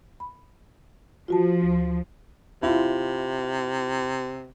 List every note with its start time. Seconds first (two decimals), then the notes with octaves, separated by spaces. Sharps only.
0.20 B5
1.28 F3 F4 F#4 A5
1.62 D2
2.63 C3 E4 F4